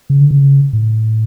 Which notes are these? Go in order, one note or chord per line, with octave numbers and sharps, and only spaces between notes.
C#3
D3
C#3
A2